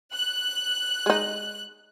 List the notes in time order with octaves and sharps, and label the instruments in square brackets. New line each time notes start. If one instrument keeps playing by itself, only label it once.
[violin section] F#6
[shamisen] G#3 D#4